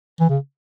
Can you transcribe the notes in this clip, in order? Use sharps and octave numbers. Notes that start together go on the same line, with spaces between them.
E3
C#3